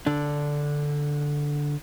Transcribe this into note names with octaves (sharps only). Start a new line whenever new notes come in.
D3 D4